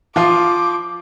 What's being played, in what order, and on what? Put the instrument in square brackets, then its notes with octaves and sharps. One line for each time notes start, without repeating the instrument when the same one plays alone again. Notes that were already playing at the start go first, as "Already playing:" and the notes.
[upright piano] F3 F4 [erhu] D6